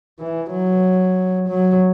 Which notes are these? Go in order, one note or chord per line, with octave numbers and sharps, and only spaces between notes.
E3
F#3
F#3